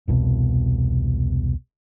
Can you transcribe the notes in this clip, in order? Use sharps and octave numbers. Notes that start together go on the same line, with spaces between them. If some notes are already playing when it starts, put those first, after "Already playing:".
E1 C2 B2